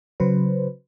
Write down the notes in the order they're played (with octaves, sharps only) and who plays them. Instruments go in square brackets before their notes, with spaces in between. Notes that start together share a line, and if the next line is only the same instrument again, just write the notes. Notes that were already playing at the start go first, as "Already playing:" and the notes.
[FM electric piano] C#3 F#3 B4 C5